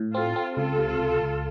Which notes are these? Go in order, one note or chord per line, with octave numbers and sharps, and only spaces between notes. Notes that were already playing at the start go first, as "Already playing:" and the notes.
Already playing: A2
C4 F4 A4
C4
C#2 F4 A4
C3
C#2
C#2